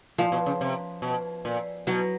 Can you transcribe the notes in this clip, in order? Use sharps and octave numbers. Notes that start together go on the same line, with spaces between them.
A#2 F3
B2
C#3
C3
B2
A#2
B2 F#3